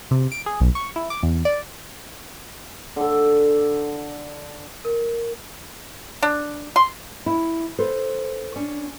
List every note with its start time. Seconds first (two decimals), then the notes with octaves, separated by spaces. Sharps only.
0.11 C3
0.32 D7
0.46 G#4
0.60 B1
0.75 C#6
0.96 E4
1.10 D6
1.23 E2
1.45 D5
2.96 D3 A4
4.85 A#4
6.23 D4
6.76 C6
7.26 E4
7.79 A4 B4 C5
8.56 C#4 D4